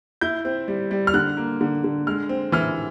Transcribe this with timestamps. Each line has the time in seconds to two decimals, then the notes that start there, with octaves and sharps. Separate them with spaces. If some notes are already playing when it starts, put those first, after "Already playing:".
0.21 E4 G6
0.45 C4
0.68 G3
0.91 G3
1.07 F6
1.14 D3 F#6
1.37 A#3
1.61 D3
1.84 D3
2.07 G#3 F6
2.29 C4
2.52 E3 F6